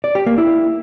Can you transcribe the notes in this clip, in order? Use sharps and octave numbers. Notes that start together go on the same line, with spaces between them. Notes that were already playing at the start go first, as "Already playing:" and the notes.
D5
G4
A#3
E4